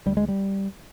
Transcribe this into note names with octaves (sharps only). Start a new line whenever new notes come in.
D2 G3
G#3
G3